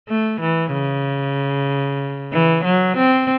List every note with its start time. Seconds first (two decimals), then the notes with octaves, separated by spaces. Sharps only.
0.09 A3
0.40 E3
0.73 C#3
2.33 E3
2.64 F#3
2.97 C4